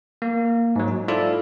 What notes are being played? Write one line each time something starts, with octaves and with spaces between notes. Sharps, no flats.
A#3
G#2 F#3
D#4
E4 F4 A4 C5 D5 F5